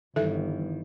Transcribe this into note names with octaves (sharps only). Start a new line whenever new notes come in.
G1 D#3 E3 A4 E5